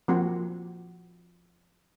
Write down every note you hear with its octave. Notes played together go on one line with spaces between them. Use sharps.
F3 A#3 C4 F#4